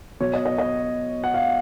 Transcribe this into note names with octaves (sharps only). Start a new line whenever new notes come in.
B2 F#3 C#5
D#5
D#5
D#5
F#5
F5